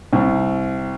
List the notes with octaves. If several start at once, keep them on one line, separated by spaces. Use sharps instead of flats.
C2